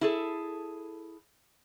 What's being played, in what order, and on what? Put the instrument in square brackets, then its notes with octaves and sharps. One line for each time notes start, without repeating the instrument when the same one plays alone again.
[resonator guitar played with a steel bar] E4 G#4 A4